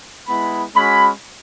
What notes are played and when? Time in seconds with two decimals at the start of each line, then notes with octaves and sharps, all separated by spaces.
0.27 G#3 B3 E4 B5
0.74 G#3 C#4 F#4 B5